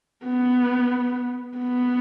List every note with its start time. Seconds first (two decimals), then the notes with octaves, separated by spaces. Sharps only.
0.25 B3
1.57 B3